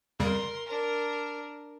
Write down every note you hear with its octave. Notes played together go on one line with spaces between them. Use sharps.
F2 C#3 G3 A#4 C6
D4 A#4